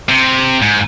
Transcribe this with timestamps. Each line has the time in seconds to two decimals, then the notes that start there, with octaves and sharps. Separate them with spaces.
0.09 C3
0.62 G#2